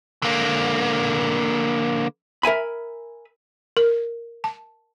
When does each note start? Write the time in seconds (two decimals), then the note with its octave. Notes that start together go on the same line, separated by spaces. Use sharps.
0.22 D3 A#3
2.43 A#4 E5 G#5 B5
3.77 A#4
4.44 A5